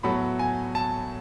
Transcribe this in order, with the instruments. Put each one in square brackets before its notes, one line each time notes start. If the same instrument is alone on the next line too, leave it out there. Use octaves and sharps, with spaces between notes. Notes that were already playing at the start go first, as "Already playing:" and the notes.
[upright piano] A2 F#3 B3 F#4 A4 [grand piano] B5
[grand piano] G#5
A5